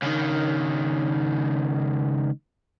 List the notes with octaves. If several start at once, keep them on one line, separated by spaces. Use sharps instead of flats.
C#2 D#3